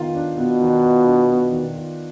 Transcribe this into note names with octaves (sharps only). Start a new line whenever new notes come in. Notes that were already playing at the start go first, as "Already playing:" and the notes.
Already playing: D#3 B3 F4
D4
B2 B3
D#3
F4
D4
B3
D#3
F4